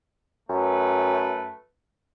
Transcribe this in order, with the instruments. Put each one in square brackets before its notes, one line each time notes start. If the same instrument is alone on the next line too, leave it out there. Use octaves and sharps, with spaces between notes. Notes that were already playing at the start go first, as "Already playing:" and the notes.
[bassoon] F#2 [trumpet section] A3 B4